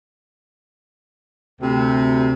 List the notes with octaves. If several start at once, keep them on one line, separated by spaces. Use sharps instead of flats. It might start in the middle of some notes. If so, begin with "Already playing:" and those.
D2 C3